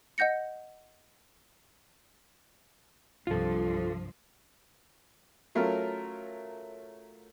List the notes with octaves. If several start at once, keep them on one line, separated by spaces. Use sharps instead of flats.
D#5 F#5 G6 A#6 C#7
C2 G2 F3 F4 A4
F#3 A3 C#4 F4 A#4